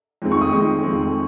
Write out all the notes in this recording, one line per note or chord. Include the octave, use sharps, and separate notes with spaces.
F2 D#3 G#3 C4
C#6
D#6
F2 D#3 G#3 C4
F2 D#3 G#3 C4